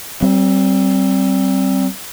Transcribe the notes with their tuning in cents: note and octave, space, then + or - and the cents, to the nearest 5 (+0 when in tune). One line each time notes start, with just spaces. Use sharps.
G3 -30 C4 +15